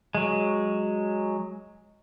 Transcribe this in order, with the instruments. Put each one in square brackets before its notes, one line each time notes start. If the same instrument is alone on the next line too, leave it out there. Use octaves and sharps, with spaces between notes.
[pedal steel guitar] F#3 G#3